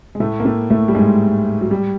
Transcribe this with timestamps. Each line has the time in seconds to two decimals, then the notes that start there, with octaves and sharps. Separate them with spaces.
0.15 G#3
0.20 A2 A3
0.40 A#3
0.45 A2 A3
0.70 A2 A3
0.88 G3
0.95 G#2 G#3
1.61 F#3
1.71 G3